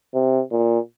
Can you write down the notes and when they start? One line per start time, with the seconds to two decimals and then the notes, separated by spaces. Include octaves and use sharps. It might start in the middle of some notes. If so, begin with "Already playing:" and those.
0.14 C3
0.52 A#2